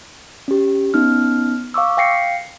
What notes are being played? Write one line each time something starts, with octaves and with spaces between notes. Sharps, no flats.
C#4 G4
B3 C#4 D#4 F6
F5 C#6 D6 E6
F5 G5 A#6 C7 C#7